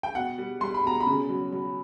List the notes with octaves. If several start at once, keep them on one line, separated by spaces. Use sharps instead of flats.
G5
B2 F#5
G3
G3 C6
B5
B2 A#5
B5
C#3
F#3
F#3